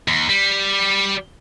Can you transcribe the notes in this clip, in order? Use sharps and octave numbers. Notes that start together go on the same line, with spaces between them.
D#2
G3